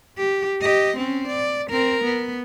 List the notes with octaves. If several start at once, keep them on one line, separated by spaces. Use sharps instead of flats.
G4
G4 D#5
C4 C#4
D5
C4 A#4
B3